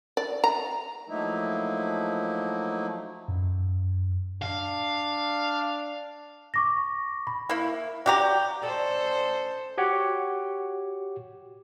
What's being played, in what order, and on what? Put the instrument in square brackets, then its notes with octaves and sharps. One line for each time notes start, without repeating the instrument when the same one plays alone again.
[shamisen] D5
A#5
[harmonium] F3 F#3 A3 A#3 D#4 E4
[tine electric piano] F#2
[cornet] D4 [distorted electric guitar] F5
[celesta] C#6 D6 A#6
B5
[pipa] A#3 E4
[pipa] F#4 G4 A#5 [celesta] D5
[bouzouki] C#4 D5 D#5 [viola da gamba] A4 C5
[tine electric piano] F#4 G4 C#5 F#5